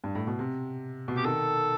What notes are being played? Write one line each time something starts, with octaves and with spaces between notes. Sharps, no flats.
G2
A2
B2
C3
B2
C3 G4
D#3 A4